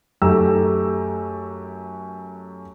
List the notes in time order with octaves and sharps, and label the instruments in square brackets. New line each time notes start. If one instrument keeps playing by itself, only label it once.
[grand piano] F#2 A3 D#4 G4 A#5 E6